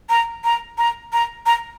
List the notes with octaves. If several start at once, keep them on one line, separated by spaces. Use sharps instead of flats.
A#5
A#5
A#5
A#5
A#5